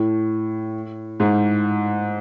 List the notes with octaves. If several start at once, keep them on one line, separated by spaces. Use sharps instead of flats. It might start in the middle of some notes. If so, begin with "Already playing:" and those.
Already playing: A2
G#2